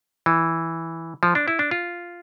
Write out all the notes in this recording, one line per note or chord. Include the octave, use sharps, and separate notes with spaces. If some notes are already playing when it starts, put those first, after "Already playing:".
E3
F3
D4
E4
D4
F4